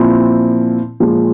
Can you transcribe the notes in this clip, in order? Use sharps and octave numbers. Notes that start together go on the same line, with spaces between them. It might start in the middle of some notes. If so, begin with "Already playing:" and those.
Already playing: A#2 F3 C4 E4
A#2 F3 G#3